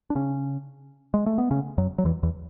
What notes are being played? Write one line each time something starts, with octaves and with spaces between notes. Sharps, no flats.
D4
C#3 C#4
G#3
A3
B3
C#3 C#4
F#2 F#3
F#3
E2 E3
E2 E3